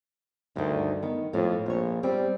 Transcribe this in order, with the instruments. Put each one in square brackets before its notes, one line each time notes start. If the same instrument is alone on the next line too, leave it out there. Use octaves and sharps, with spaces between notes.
[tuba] D2 [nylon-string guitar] G2 D#3
[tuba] D#3 [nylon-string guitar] B3
[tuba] F2 [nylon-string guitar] A2
[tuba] A#1 [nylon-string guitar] C5 C#5
[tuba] G3 [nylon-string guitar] C4